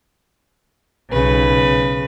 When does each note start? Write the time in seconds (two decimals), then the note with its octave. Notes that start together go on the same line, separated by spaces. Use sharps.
1.11 B1 C#3 B4